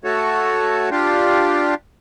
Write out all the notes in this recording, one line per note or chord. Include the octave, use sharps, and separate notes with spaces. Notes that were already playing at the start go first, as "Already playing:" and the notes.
A3 F#4 A4 C#5
D4 F4 G4